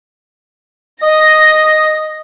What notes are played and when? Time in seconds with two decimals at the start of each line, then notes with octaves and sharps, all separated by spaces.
1.02 D#5 A#6